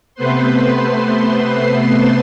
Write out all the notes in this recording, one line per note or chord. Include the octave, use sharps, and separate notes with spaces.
C3 A3 B3 B4 C5 C6